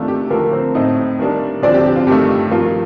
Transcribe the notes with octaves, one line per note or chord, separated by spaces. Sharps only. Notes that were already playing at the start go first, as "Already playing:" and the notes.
Already playing: C3 D#3 A3 D4 F4
G4
D3 F3 A3 A#3 A#4
C4 C5
A2 A3 C4 D#4 D#5
D#3 G3 A#3 D4
D3 F3 C4 D4 D5
G4
G4
F4
G2 D#3 A3 G4
G2 F3 A#3 F4